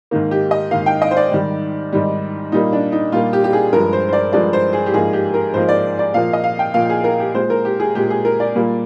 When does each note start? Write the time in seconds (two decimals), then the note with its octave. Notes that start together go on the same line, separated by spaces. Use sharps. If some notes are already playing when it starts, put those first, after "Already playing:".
0.11 G#2 D#3 A#3
0.31 G4
0.51 D#5
0.71 G#2 D#3 A#3 F5
0.86 G5
1.02 D#5
1.11 C5
1.17 D5
1.31 G#2 D#3 G3
1.93 G#2 D#3 G3
2.52 A#2 G3 A#3 D#4
2.73 D4
2.92 D#4
3.12 A#2 G3 A#3 F4
3.33 G4
3.44 G4
3.53 G#4
3.73 G2 F3 G#3 A#4
3.93 C5
4.09 C5
4.13 D5
4.33 G2 F3 G#3 D5
4.53 C5
4.73 G#4
4.86 G4
4.93 G#2 F3 A#3 G#4
5.13 G4
5.34 A#4
5.53 G#2 F3 A#3 C5
5.69 D5
5.99 D5
6.14 A#2 F3 A#3 F5
6.33 D#5
6.44 F5
6.59 G5
6.74 A#2 F3 A#3 F5
6.90 G#4
7.04 A#4
7.20 G4
7.34 A#2 G#3 C5
7.50 A#4
7.65 G4
7.80 G#4
7.95 A#2 G#3 G4
8.10 G#4
8.25 A#4
8.40 D5
8.55 A#2 G3 A#3